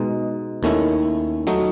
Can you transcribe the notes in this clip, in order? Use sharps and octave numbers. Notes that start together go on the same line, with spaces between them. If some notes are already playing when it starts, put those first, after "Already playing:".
Already playing: B2 G#3 D#4
D#2 D#3 A3 C#4 E4
F#3 A3 D#4